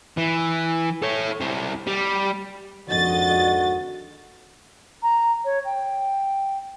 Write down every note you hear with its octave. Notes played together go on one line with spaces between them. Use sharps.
E3
A4 C#5
C4 E4
G3
G#1 F2 D3 F#4 D#5 A6
A#5
C#5
G5